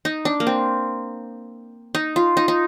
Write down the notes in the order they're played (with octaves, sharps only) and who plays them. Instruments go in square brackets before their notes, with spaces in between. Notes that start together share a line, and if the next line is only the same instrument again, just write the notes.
[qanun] D#4
D4
A#3
C4
D#4
F4
D#4
D#4